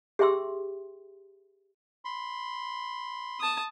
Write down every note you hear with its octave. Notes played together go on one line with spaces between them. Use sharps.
G4 G#4 E5 G5 C6 E6
B5 C6
A5 D#6